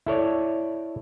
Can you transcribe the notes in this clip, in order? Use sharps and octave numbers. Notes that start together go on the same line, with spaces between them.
E4 A4 C#5 D5